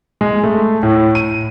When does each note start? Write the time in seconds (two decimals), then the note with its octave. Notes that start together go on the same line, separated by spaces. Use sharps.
0.21 G#3
0.44 A3
0.83 A2
1.15 D#7